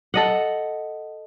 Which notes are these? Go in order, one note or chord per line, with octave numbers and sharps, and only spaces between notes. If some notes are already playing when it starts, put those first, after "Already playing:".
A4 D#5 F#5